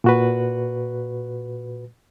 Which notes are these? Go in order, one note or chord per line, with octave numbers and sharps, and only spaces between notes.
A#2 F#4 B4